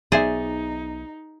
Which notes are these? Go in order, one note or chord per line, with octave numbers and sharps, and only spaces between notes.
B1 B3 D#4 G#4 C5 D5 E5